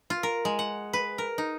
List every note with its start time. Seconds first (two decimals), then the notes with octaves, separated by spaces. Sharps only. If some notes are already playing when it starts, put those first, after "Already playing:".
0.10 F4
0.23 A#4
0.45 G#3
0.59 F#5
0.93 B4
1.18 A#4
1.38 D#4